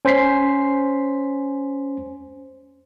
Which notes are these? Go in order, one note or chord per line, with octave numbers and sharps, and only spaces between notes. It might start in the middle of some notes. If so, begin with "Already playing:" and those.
C#4 C5 G#5 B6 C7